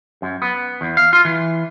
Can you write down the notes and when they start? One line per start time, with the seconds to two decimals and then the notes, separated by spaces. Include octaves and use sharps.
0.22 F#2
0.42 B3
0.81 E2
0.97 F5
1.13 F4
1.25 E3